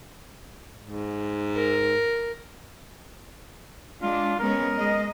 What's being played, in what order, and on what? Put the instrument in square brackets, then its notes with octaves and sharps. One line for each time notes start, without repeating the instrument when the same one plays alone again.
[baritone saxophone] G#2
[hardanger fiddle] A#4
[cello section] G#3 D4 [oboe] F4
[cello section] G#3 B3 C#4 [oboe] A#4
[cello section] G#3 D#5